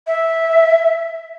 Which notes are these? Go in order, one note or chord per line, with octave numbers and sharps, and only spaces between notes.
E5